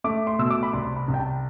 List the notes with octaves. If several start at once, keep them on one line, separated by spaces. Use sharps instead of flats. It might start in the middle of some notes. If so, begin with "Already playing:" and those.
A3 D6
C6
B2 E6
D6
B5
C2 C6
B5
C2
G5
A5